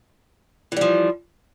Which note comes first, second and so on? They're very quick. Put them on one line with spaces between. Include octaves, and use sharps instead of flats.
E3 G3 F3